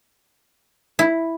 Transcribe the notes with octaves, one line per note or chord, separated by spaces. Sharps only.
E4